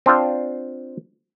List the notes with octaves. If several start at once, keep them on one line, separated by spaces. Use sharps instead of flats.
C4 D4 F4 C5